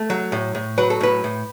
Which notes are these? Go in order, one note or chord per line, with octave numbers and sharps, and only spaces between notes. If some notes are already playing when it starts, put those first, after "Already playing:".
Already playing: A3
F#3
A2
A2
F#3 B4
A4
A2 B4
A2